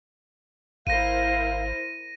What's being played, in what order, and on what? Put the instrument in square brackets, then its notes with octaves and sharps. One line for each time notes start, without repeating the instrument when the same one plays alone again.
[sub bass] G#1 [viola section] E4 A#4 C5 [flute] F5 [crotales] A#6 D#7